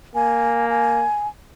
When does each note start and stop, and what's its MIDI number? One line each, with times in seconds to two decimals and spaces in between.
0.15 1.05 58
0.15 0.66 80
0.70 1.27 80